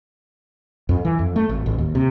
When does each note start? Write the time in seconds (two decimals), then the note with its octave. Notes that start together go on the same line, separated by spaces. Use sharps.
0.89 F2
1.05 E3
1.19 F2
1.36 A3
1.49 G#1
1.66 A1
1.78 D#2
1.95 C3